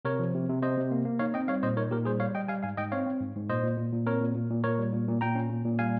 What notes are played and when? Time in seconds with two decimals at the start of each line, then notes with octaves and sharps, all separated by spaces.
0.05 C3 A#4 C#5
0.19 F3
0.34 C3
0.49 C3
0.62 C3 C5 D#5
0.78 C3
0.91 A#3
1.05 A#3
1.19 D#4 C#5 F5
1.34 C4 D#5 G5
1.48 G3 C#5 F5
1.63 A#2 C5 D#5
1.77 D#4 A#4 C#5
1.91 A#2 G4 A#4
2.05 G3 G#4 C5
2.20 G3 C#5 F5
2.35 G3 D#5 G5
2.48 G3 F5 G#5
2.63 G#2 F5 G#5
2.77 G#2 D#5 G5
2.92 C4 C#5 F5
3.06 C4
3.21 G#2
3.36 G#2
3.49 A#2 C5 D#5
3.63 A#2
3.77 A#2
3.93 A#2
4.06 C4 A#4 C#5
4.21 A#2
4.35 A#2
4.50 A#2
4.64 A#2 A#4 C#5
4.79 G3
4.92 A#2
5.08 A#2
5.21 A#2 G5 A#5
5.35 C#4
5.50 A#2
5.65 A#2
5.79 G3 F5 G#5